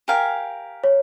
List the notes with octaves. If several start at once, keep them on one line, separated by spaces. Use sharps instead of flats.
G4 A#4 F5 G#5
C#5